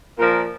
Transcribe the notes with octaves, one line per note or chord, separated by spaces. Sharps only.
A#2 F3 A#4